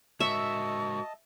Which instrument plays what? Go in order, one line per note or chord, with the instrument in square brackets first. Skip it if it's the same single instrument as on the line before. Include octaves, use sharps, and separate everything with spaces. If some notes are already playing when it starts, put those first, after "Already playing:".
[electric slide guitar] G#3 F#4 A#4 [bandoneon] D#5 A5 [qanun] E5 [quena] C#6